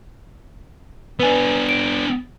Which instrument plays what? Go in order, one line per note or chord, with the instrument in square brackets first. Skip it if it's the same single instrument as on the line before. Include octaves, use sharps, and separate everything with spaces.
[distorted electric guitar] B3 D4 [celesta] B4 G#5
[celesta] D7